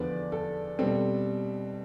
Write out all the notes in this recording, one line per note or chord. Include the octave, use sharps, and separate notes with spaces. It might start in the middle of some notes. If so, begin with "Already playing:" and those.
Already playing: E2 D3 F3 B3 B4 D5
A4
B2 G3 C4 A4